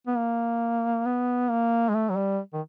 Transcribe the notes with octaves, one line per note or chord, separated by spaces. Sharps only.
B3
A#3
B3
A#3
G#3
A3
F#3
G3
D#3